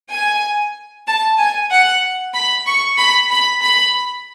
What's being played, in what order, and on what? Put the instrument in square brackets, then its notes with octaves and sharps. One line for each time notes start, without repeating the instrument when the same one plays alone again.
[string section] G#5
A5
G#5
F#5
B5
C#6
B5
B5
B5